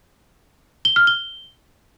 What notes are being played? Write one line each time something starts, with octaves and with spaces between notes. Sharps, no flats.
G7
F6
G7